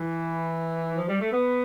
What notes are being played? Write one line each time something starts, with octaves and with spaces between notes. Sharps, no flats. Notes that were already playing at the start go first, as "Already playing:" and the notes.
Already playing: E3
F3
G3
A3
B3